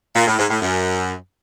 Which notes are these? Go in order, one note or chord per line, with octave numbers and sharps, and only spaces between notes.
A#2
A2
G#2
A2
F#2